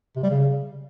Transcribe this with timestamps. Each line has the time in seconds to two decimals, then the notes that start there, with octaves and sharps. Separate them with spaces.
0.16 C3
0.23 G3
0.30 C#3